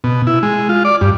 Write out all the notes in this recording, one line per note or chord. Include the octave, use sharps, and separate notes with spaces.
B2
E4
G#3
F4
D5
G2